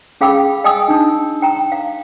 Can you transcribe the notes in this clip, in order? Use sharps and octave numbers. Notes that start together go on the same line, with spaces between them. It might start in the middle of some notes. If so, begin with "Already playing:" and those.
C#4 G#4 F5 G5 B5 E6
D#5 G5 G#5 D#6 E6
D4 D#4
G5 A#5
F5